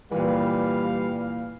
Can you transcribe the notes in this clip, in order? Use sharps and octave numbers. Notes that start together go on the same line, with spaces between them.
A#2 E3 G3 B4 F5